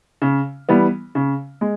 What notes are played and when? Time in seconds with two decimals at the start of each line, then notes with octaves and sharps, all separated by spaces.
0.22 C#3
0.69 E3 G3 B3
1.15 C#3
1.61 G#3